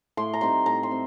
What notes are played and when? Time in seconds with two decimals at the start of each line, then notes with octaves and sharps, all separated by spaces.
0.17 A2 C6
0.33 A#5
0.41 G3 C4 D#4 C6
0.66 A2 A#5
0.83 C6
0.91 G3 C4